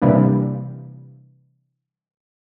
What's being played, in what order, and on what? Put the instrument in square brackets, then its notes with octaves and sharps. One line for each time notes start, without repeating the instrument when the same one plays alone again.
[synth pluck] C3 E3 G3 A#3 D4